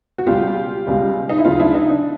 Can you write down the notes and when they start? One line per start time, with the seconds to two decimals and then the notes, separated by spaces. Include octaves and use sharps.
0.18 F#4
0.27 C#2 B2 G3 F4 G4
0.86 C#2 B2 G3
1.29 D#4
1.38 E4
1.45 D2 C#3 F#3 D#4 F4
1.60 D4 E4
1.75 D#4
1.90 D4